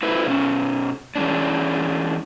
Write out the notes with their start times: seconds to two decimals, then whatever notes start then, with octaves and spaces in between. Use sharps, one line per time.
0.03 E4 A4 B4 C5 E5
0.27 B2 C#4
1.16 E3 G#3 C#4 D4